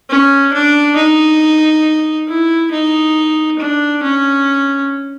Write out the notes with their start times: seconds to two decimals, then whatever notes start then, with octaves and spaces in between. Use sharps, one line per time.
0.10 C#4
0.53 D4
0.97 D#4
2.28 E4
2.71 D#4
3.59 D4
4.03 C#4